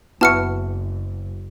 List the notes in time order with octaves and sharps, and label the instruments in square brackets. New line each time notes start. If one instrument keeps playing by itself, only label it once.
[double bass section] F#1 [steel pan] B3 E4 F#4 [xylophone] A5 F6 C#7